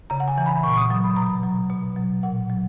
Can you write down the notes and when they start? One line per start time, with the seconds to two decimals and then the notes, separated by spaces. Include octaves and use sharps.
0.10 C#3 A#5
0.20 F#5
0.28 G#5
0.38 E3
0.46 B5
0.63 A#2 C#6
0.77 D#6
0.90 F#3 D#6
1.04 B5
1.16 B2 A#5
1.44 F#3
1.70 B2
1.96 F#3
2.23 A#2 F#5
2.50 F#3